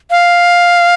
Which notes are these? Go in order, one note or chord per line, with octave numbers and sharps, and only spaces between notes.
F5